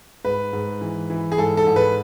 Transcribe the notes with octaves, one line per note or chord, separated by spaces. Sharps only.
G#2 B4
G#2
E3
E3
G#4
G#2 A4
A4
G#2
B4